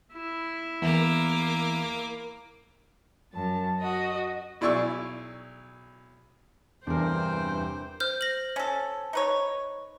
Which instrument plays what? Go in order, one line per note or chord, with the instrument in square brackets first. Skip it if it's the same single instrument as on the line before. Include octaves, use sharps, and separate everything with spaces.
[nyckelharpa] E4
[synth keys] E2 [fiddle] A#3 D6
[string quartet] F#2 A5
F#4 D#5
[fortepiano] B1 E4 G#4 D5 C#6 E6
[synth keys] E2 [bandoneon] G2 C3 E3 [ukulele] D4 A#4 [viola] C5 G5
[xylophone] C5 F6 G6
A#6 F#7
[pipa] C#4 A4
D#4 B4 C#5